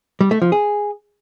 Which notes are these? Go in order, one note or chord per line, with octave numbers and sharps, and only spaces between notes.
G3
A3
F3
G#4